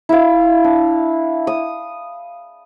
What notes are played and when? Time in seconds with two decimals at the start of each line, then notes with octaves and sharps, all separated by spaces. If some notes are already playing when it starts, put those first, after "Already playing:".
0.09 E4 F5
0.64 D4
1.47 D#6